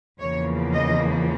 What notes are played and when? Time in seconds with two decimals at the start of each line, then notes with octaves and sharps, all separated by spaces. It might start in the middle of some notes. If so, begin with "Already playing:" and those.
0.20 E2 C#3 F3 A#3 C#5
0.74 D#5